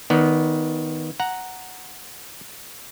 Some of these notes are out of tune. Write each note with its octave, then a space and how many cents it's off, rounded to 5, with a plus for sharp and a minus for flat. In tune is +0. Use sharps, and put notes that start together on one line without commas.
D#3 +15 B3 +0 D5 -15
F#5 +0 A#5 +0